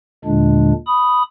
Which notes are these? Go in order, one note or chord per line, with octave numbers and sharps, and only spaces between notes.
D#2 A#2 D3 G#3 D4
B5 D#6